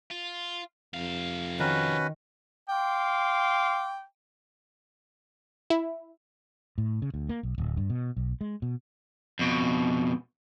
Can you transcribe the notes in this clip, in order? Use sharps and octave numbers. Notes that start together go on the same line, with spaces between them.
F4
F2 C3 F5
D#3 C#4 F#4 B4
F5 G5 C6 D6
E4
A2
C#3
D2
A#3
B1
D1
G2
B2
B1
G#3
B2
F2 B2